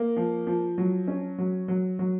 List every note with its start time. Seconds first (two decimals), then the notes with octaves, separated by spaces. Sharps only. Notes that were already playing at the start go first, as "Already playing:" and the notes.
Already playing: A#3
0.16 F3
0.47 F3
0.78 F#3
1.07 C#4
1.38 F#3
1.68 F#3
1.99 F#3